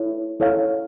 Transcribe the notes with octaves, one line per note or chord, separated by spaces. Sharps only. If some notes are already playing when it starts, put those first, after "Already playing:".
Already playing: E4 A4 C#5
E4 A4 C#5 F5